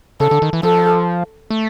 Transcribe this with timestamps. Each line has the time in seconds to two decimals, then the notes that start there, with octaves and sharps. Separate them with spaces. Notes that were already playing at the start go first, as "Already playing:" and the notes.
0.20 C#3 A4
0.31 D3
0.42 D#3
0.53 E3
0.63 F3 A4
1.50 A3